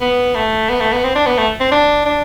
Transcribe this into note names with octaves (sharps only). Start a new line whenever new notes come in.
B3
A3
B3
A3
B3
C4
D4
B3
A3
C4
D4
D4